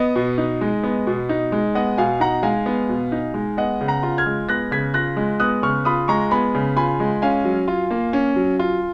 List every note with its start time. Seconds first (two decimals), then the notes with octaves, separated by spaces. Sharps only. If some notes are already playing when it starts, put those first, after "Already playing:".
Already playing: B3 D#5
0.16 B2
0.38 D#4
0.61 G#3
0.83 B3
1.07 B2
1.29 D#4
1.52 G#3
1.75 B3 D#5 F#5
1.98 B2 F5 G#5
2.20 D#4 F#5 A#5
2.43 G#3 F5 G#5
2.66 B3
2.89 B2
3.12 D#4
3.34 G#3
3.57 B3 D#5 F#5
3.81 C#3
3.88 F#5 A#5
4.03 F4
4.18 F6 G#6
4.26 G#3
4.49 B3 F#6 A#6
4.71 C#3 G#6 B6
4.94 F4 F#6 A#6
5.17 G#3
5.40 B3 D#6 F#6
5.62 C#3 C#6 F6
5.85 F4 B5 D#6
6.08 G#3 A#5 C#6
6.31 B3 G#5 B5
6.55 C#3
6.77 F4 G#5 B5
7.00 G#3
7.22 C#4 F5 G#5
7.45 F#3
7.68 F4
7.91 A#3
8.13 C#4
8.36 F#3
8.59 F4